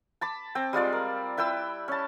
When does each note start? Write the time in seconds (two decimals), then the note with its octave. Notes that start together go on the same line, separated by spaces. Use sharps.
0.21 A5 B5 D6
0.55 C4 G5
0.73 G3 G#3 F4 D5
0.93 A#4
1.37 E4 B4 G5 E6
1.88 C#4 A5